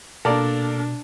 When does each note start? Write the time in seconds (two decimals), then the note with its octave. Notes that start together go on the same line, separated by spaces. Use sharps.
0.25 B2 A#3 D4 A4 A#4 D5